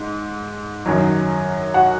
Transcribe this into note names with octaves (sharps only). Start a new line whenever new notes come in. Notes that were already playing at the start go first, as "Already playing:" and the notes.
Already playing: G#2
F#2 D#3 F#3
F#4 F#5